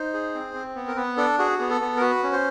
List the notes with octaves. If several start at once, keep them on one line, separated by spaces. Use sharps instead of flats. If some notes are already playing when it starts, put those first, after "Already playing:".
Already playing: D#4 C5
G#4
C4
C4
B3
A#4
B3 B4
D4 A4
F#4 G#4
B3 G#4
A4
B3
A#4
F#4 B4
C#4
C5